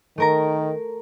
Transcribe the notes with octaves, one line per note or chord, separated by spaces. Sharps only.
D#3 A3 A#4 A#5